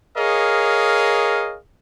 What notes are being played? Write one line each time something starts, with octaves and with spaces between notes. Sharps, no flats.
G#4 A#4 C#5 D#5 F5